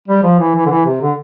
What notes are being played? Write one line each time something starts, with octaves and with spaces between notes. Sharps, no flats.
G3
F3
E3
E3
D3
E3
C3
D3